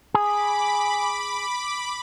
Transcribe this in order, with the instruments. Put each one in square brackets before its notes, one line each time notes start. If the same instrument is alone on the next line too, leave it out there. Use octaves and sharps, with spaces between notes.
[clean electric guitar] G#4 [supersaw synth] B5 D6